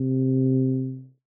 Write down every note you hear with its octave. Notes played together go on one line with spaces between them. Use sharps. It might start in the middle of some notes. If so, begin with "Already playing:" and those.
Already playing: C3